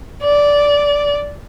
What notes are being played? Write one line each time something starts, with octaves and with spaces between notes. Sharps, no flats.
D5